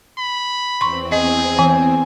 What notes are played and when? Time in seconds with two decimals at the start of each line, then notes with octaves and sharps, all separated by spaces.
0.19 B5
0.81 E2 C4 C6 C#6
1.12 G#4 D#5
1.59 E3 G#5